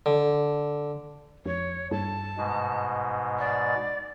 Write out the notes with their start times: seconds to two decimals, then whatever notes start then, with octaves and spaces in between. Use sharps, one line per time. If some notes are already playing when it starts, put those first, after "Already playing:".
0.06 D3
1.46 F2 C#5
1.91 G2 A5
2.38 G#2 B2 G#3
3.39 D5